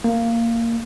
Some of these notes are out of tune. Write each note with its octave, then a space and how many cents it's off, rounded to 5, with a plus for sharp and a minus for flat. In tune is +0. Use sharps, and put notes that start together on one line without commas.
A#3 -15